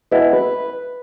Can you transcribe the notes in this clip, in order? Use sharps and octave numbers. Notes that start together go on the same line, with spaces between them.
B2 G#3 B3 E4
B4